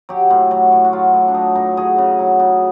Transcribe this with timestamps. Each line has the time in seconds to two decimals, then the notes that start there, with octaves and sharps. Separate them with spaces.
0.09 F#3 G4
0.30 A2
0.51 F#3
0.72 A2
0.85 F#4
0.93 F#3 F4
1.14 A2
1.28 D4
1.34 F#3 D#4
1.55 A2 D#4
1.77 F#3 G#4
1.98 C#3
2.19 F#3
2.39 C#3